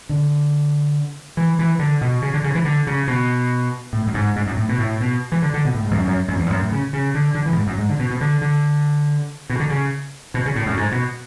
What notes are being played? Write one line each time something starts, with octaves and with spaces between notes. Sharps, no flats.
D3
E3
E3
D3
B2
C#3
D3
C#3
E3
D3
C#3
B2
A2
F#2
G#2
G#2
F#2
A2
B2
A2
B2
E3
D3
D3
B2
A2
G#2
E2
F#2
F#2
F#2
E2
F#2
A2
C#3
C#3
D3
D3
E3
A2
G#2
F#2
G#2
D3
B2
B2
D3
D3
B2
D3
C#3
B2
C#3
A2
F#2
G#2
B2